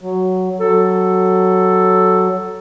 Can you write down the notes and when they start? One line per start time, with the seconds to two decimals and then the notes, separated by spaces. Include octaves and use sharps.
0.01 F#3
0.60 F#3 A4